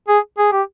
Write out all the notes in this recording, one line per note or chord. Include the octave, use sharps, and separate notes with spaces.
G#4
G#4
G4